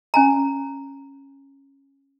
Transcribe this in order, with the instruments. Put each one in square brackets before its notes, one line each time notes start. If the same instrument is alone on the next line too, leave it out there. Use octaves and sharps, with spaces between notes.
[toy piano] C#4 G#5 A#5